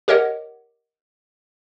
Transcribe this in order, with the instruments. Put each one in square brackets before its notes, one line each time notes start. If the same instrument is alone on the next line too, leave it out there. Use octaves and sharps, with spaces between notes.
[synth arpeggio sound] G4 A#4 C#5 D#5 F#5